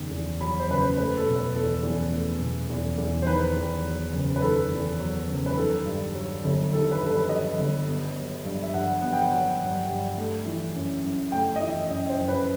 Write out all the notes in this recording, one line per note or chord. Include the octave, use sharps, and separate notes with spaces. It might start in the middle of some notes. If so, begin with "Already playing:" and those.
Already playing: F#1 E2 D#3
E2
F#3 B5
C5
F#1 B4
C5
A3 B4
A4
B2
B4
E2 A4
E2
A3
B2
E2
E2
C5
D#3 B4
E2
F#3
F#1
B4
D#3 A4
E2
F#3
F#1
B4
D#3 A4
G2
F#3
G1
D#3 A4
B4
G2 A4
B4
F#3 D#5
G1
B3
F#3
G2
E5
G2 F#5
B3 F#5
G5
F#5
F#3
G2
G2
A3
E3
F#2
F#2
A3 G5
D#5
E3 E5
F#2 D#5
C5
F#2
B4